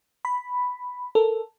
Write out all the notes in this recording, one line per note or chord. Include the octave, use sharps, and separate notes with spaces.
B5
A4 A#4